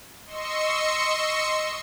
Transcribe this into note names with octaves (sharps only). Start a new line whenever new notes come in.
D#5 C6 C#6 E6 C#7